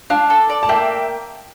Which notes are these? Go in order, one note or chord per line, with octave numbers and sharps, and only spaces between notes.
D4 F5 A5
A4
D5
A5
A#3 E5 G5